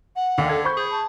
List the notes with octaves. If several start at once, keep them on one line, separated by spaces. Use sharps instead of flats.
F#5
D#2 D3
A4 G#6
C5 B5 C#6 G6
G#4
A5